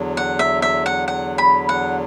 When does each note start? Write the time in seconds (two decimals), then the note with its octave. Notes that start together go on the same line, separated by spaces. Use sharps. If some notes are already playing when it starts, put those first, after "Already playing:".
Already playing: E2 D3 F#3
0.17 F#5
0.39 E5
0.62 E5
0.86 F#5
1.08 F#5
1.38 B5
1.69 F#5